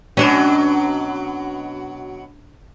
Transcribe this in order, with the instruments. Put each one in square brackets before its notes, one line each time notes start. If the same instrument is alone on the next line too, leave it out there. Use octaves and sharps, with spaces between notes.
[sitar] B2 F#3 [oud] C#4 D4